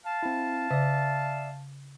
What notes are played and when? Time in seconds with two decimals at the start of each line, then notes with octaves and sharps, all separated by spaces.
0.05 F5 A5
0.23 C4 E4
0.71 C#3 D5 E5